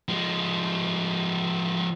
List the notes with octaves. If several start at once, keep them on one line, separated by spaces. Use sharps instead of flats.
F3 G#3